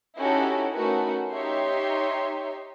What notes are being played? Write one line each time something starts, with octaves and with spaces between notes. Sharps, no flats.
C#4 D#4 E4 F#4 G4 A4
A3 C#4 D#4 F#4 A#4 B4
D#4 G4 C#5 E5 C6